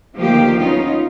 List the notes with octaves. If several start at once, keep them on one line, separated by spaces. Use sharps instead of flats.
D2 D#3 F3 A#3 G4
B3 C#4 D#4 F4